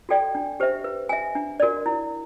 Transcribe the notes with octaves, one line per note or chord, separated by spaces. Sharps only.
F#4 A4 D5 G5
D4
G4 C5 E5
B4
E5 G#5
D4
F#4 A#4 D5
E4